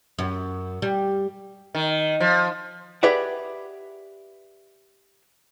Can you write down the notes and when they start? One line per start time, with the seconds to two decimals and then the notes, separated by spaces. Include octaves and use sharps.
0.19 F#2
0.82 G3
1.75 D#3
2.20 F3
3.03 G4 G#4 B4 D5 E5 F#5